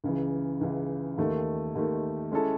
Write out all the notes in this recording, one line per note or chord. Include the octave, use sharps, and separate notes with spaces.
C#2 C#3 E3
C#2 C#3 E3
D#2 D#3 A3
D#2 D#3 A3
G#3 C#4 E4 A4